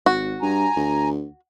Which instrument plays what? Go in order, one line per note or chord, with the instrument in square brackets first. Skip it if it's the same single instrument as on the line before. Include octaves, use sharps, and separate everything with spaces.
[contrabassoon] G#1 [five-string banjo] F#4
[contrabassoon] G2 [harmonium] G#5 A#5
[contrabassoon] D2